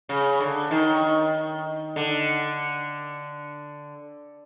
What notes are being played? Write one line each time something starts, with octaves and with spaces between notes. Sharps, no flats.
C#3
D3
D#3
D3